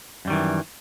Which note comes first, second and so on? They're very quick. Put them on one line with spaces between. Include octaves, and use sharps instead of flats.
F#2 G3 D#3 E3